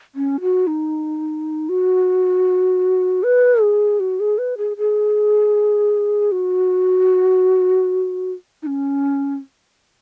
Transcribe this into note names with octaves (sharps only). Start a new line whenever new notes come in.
C#4
F#4
D#4
F#4
B4
G#4
F#4
G#4
B4
G#4
G#4
F#4
D#4
C#4